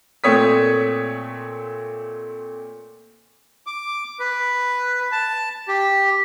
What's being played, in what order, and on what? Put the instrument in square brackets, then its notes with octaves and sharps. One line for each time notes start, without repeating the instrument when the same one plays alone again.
[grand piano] A#2 A3 C4 C#5 D#6 B6
[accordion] D6
B4
A5
G4